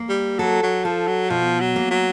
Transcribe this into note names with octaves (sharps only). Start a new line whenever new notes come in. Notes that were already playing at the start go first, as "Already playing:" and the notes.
Already playing: A#3
G3
F#3 A4
F#3
F3 A4
F#3
B2 F3
F#3
A#3
F#3